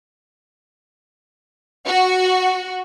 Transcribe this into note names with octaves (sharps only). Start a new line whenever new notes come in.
F#4